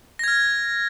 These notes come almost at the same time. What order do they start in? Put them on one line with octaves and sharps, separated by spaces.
A#6 G#6 F6